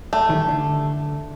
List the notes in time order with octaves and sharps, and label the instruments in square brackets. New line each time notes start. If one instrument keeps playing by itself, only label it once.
[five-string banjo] A3
[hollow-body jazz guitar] D#3 E3 G3
D3